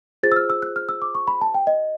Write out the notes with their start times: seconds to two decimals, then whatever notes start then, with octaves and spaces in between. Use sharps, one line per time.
0.23 F4 G#4 C5 A6
0.32 E6
0.36 F6
0.50 E6
0.62 F#6
0.76 F6
0.89 E6
1.02 D6
1.15 C#6
1.27 B5
1.41 A5
1.54 G5
1.67 D#5